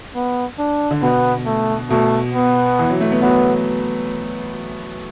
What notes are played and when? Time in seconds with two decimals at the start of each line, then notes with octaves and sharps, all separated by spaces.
0.15 B3
0.59 D4
0.91 D3
1.02 B2 B3
1.46 A3
1.90 B2 A3
2.34 B3
2.79 E3
2.90 F#3
3.01 A3
3.11 B3
3.22 F#3 B3